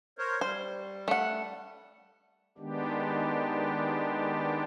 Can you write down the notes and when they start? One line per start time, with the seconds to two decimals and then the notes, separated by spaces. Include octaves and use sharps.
0.18 A#4 C5 C#5
0.41 G3 C5
1.08 A3 F#5
2.58 D#3 G#3 B3 D4 G4